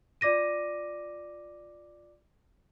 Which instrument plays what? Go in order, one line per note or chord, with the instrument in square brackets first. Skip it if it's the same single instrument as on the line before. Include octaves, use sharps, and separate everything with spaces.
[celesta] F4 D5 D6 A#6 D#7